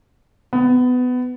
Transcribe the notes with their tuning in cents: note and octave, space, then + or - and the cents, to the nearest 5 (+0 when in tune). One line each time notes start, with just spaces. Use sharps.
B3 +20